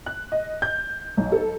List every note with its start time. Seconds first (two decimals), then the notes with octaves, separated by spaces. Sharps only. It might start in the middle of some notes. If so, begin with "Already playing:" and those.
0.06 F#6
0.32 D#5
0.62 G6
1.17 B1
1.32 A4